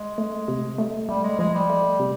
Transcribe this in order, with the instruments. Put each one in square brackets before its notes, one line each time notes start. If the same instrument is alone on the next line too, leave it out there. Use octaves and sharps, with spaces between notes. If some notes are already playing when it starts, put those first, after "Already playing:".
Already playing: [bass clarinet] G#3
[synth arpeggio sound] A3
C3
A3
[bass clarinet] G3 [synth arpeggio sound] A3
[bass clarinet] G#3
[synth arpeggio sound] F3 [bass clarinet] G#3
[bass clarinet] G3
[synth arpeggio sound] A3
C3